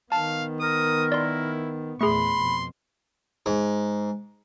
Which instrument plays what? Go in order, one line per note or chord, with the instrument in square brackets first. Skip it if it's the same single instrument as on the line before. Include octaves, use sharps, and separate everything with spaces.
[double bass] D#3 B3 [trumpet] F5 [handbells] A5
[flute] A#4 [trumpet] D#6
[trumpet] E4 [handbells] D5 C6
[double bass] E2 A#2 [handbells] A3 G#4 [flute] B5 [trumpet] C6
[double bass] F2 B2
[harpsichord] G#2